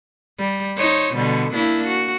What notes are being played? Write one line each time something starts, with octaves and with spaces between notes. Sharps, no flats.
G3
D#4 C5 C#5
B2 D3 G3
A#3 D4 E4
F#4